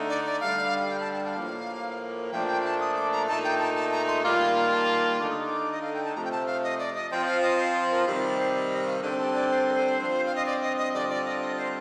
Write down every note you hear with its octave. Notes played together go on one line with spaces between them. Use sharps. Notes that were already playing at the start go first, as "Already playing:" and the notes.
Already playing: D3 A3 D#4
D5
D5
G2 D3 G3 F5
G5
A5
A5
G5
F5
A2 F3 A#3
A#2 F3 A3 D4 G5
G5
A5
D#6
D6
A#5
A#2 A3 D#4 A5
G5
A5
A5
A#5
C6
D#3 G3 A#3 F4 D6
C6
A#5
A5
A5
D3 A3 D#4 D6
D#6
D6
D#5
F5
G5
A5
C3 F3 A3 A#5
G5
A5
F5
D#5
D5
D#5
F3 C4 F4 G5
F5
D#5
C5
A#4
C3 D#3 G3 C5
D5
C5
D5
D#5
F5
D3 G3 C4 G5
A5
D5
C5
A#4
C5
G2 F3 C4 F4
F5
D#5
D5
D#5
D#5
D3 G3 C4 F4 D5
D5
D#5
D#5
C5